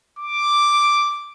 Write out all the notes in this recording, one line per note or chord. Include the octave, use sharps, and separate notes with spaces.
D6